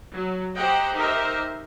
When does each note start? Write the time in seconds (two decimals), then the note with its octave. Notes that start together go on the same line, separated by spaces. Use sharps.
0.15 F#3
0.56 G4 C5 D#5 F#5 G5 A#5
0.94 D#4 G4 A#4 C5 D#5 E5